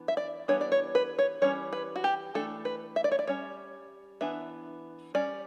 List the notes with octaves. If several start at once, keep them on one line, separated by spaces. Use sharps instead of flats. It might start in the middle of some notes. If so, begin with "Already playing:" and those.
Already playing: E3 B3 D4
E5
D5
E3 G3 B3 D4 C#5
D5
C#5
B4
C#5
E3 G3 C#4 C#5
B4
F#4
G4
E3 A3 D4 A4
B4
E5
D5
C#5
D5
G3 C#4 C#5
E3 B3 D4 E5
G3 C#4 D5